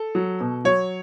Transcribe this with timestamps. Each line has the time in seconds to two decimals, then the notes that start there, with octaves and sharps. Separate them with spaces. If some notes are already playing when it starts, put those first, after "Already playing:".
Already playing: A4
0.15 F#3
0.40 B2
0.65 F#3 C#5